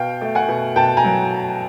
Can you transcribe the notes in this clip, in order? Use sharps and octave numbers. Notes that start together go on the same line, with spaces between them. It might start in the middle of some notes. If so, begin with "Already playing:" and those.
Already playing: B2 F5 G5
A3
F#5 G#5
B2
B2 G5 A5
G#5 A#5
F#3